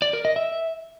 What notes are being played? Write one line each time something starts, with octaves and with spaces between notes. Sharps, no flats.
D5
A#4
D#5
E5